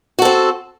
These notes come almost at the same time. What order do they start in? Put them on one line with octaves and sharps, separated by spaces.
F#4 A4 C4